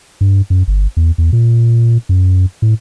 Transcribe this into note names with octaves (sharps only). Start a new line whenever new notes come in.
G2
F#2
G1
E2
E2
A#2
F#2
A2